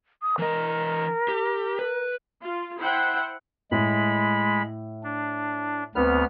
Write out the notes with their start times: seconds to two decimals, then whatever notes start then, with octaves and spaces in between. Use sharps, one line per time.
0.22 D#6
0.39 E3 A#4 D#5
1.28 G4
1.79 B4
2.41 F4
2.79 E4 C5 F#5 G5
3.71 A2 G#3 B5
5.03 D4
5.95 D2 B3 C4 B4 F6